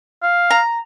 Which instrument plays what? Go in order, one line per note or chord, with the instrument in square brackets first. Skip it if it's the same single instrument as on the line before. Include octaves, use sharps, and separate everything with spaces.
[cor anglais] F5
[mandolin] A#5